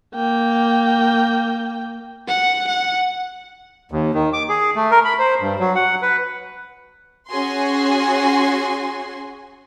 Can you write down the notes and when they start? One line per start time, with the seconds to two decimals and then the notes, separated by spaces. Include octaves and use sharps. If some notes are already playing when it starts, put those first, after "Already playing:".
0.15 A#3 G5
2.28 F#5
2.68 F#5
3.92 D#2
4.14 D#3
4.33 D6
4.49 G#4
4.76 A3
4.91 A#4
5.05 B5
5.19 C5
5.41 G2
5.59 F#3
5.75 F#5
6.02 B4
7.31 C#4 F#4 G#4 G#5 C6